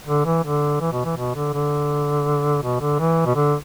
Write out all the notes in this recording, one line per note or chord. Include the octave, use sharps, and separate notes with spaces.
D3
E3
D3
E3
B2
E3
B2
D3
D3
B2
D3
E3
B2
D3